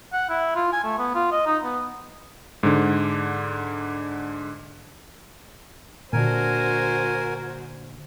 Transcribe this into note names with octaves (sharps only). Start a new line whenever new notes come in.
F#5
E4
F4
G#5
A3
B3
F4
D#5
D#4
B3
G#2 D3
A#2 D3 D4 F#4 A#4 C5 G#5